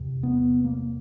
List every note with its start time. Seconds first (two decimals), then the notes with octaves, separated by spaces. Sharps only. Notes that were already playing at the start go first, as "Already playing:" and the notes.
Already playing: E2 C3
0.23 B3
0.64 A#3